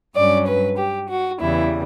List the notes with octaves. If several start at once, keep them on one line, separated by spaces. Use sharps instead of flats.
G2 F#3 C#4 D5
B4
G4
F#4
E2 C#3 E3 G3 E4